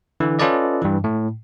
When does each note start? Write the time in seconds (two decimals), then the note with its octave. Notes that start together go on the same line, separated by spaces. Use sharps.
0.20 D3 E3
0.39 C#4 F4 A4 B4 D5 D#5
0.82 G2 E3
1.04 A2